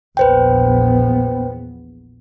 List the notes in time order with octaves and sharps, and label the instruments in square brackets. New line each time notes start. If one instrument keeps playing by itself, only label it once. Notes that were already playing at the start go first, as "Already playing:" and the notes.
[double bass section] A#1 E2 B3 [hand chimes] B4 C5 G5